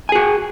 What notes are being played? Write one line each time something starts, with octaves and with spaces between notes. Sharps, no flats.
F#4 G#4 G#5